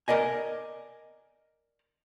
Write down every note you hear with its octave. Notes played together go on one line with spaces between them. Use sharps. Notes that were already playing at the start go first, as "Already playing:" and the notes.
A#4 D5 D#5 G#5